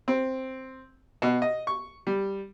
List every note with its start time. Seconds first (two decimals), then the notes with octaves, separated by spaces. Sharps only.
0.08 C4
1.22 B2
1.42 D#5
1.67 C#6
2.07 G3